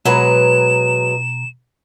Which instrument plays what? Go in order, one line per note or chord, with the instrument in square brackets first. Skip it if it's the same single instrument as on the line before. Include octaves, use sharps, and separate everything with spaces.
[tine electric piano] B2 A#5 [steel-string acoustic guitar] F#3 G#3 B4 [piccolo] E7